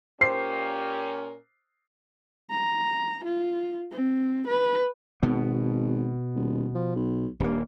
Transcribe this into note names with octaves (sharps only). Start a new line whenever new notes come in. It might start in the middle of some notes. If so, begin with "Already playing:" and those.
A#2 C#4 G4 A#4 C5 C7
A#5
F4
C4
B4
G#1 B2 B3
D#1
F3
B1
D#1 G2 A#3